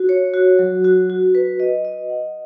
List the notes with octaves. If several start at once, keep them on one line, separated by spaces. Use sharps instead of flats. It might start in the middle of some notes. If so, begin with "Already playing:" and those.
Already playing: F#4
C#5
F#4
F#3
F#4
F#4
B4
D#5
D#5
F#5